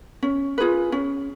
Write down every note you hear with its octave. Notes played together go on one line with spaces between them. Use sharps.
C#4
F4 G#4 B4
C#4